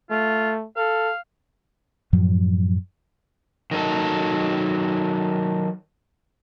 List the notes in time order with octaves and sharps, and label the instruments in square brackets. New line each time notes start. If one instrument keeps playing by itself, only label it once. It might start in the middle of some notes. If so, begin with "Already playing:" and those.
[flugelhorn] A3 [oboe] F4
[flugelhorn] A4 [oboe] F5
[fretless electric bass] F#2 A2 F3 F#3
[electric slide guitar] D#3 F#3 A4